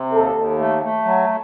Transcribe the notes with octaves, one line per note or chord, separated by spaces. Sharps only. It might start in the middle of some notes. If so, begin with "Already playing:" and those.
Already playing: C3
D#2 A4
D#2
A3
A3
F#3